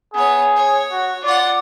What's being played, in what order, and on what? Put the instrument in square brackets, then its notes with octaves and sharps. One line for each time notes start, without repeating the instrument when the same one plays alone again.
[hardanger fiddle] B3 C#5 [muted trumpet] G#4
[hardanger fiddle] C#5
[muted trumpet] F#4
[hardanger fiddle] F4 F#5 [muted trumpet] D5